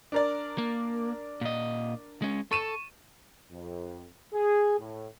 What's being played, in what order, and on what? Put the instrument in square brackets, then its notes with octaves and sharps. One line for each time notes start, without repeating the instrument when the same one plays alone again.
[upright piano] D4 A#4 D5
[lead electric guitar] A#3
A#2 D#5
G#3 C#4
[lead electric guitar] A4 [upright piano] C#6 D#7 E7
[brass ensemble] F2
G#4
A2